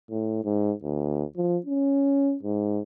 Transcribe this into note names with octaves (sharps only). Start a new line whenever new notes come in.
A2
G#2
D2
F3
C#4
G#2